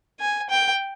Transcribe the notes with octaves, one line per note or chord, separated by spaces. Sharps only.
G#5
G5